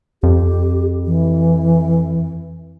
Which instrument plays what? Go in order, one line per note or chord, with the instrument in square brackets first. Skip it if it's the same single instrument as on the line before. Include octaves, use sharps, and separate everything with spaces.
[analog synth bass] F2 [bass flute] G4
[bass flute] E3